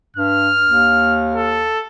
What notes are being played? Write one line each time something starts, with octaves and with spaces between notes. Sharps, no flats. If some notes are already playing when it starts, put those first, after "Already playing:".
G2 F6
D#2
A4